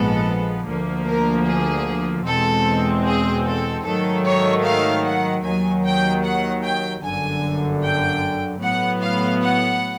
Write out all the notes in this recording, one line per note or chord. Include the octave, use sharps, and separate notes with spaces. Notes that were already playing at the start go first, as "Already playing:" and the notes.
Already playing: A#1 G#2 F3 G#3 B3 A4
D2 D3 F3 A#3
A#4
G#4
E2 B2 G#3 C4 A4
G#4
A4
G#2 D#3 F#3 A3 A4
C#5
F5
F#5
D#2 D#3 F#3 G#5
G5
F#5
G5
G1 F#2 D3 G#5
G5
A2 F#3 B3 F#5
F5
F#5